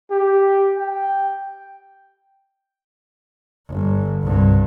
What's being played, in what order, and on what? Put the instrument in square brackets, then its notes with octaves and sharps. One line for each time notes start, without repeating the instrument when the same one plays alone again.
[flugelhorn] G4
G5
[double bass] G1
C2 G2